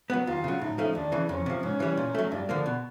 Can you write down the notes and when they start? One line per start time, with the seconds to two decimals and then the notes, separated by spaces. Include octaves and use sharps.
0.10 F#3 B3
0.27 D#2 F4
0.44 C#3 F#3
0.61 A2 D#4
0.78 F3 A3 C#4
0.95 D#2 D4
1.12 C#3 E3
1.29 F2 C#4
1.46 C3 F3
1.63 G#2 C#4
1.80 E3 G3
1.97 A#2
2.15 F#3 A3
2.31 G2 D4
2.49 D3 F3 A#3
2.66 B2